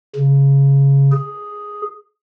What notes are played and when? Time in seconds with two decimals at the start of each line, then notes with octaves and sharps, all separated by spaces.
0.15 C#3
1.12 G#4